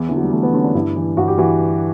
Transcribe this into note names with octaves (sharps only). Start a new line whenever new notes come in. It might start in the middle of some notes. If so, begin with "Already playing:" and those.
Already playing: E2
D3 E3
F#3
G3
E2 A3
B3
D3 C#4
D4
G2 E4
E3
G2 F#4
G4
E3 F#4